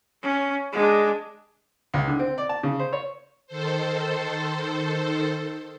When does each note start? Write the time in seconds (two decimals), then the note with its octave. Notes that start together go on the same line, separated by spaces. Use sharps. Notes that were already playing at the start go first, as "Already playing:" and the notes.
0.23 C#4
0.72 G#3 D4
1.94 C#2
2.08 D3
2.19 C4
2.38 D5
2.49 A5
2.63 C#3
2.79 C5
2.93 C#5
3.47 D#3 A4 C5